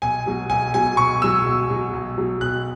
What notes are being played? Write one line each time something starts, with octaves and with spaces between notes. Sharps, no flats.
B1 G#5
B2 F#3
B1 G#5
B2 F#3 G#5
B1 C#6
B2 F#3 E6
B1
B2 F#3
B1
B2 F#3
B1 F#6